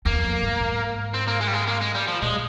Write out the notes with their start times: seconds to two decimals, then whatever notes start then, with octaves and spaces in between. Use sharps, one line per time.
0.05 E2 A#3
0.24 F2
0.42 G2
0.60 G#2
1.14 C4
1.28 A#3
1.41 G#3
1.48 G3
1.54 G#3
1.67 A#3
1.81 G#3
1.95 G3
2.08 F3
2.22 A#2 G#3